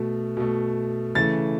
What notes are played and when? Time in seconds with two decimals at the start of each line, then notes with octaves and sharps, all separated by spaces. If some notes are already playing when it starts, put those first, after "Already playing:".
Already playing: B2 A3
0.37 B2 A3
1.15 C#3 E3 A3 A6